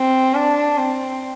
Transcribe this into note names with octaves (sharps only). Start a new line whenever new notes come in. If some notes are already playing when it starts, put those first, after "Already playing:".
Already playing: C4
D4
C4